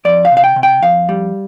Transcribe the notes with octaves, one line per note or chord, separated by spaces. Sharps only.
F2 D5
F5
C3
F5
G5
C3
G5
F2 F5
G3